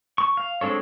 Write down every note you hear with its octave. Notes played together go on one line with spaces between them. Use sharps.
C#6
F5
G#3 C4 D4 A4 C#5